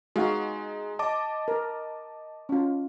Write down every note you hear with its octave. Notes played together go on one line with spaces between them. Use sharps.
G#3 D#4 F#4 F5
D#5 A5 D6
A#4
C#4 F4